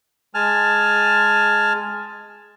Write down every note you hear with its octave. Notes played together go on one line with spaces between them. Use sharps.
G#3 G#5 A5 F6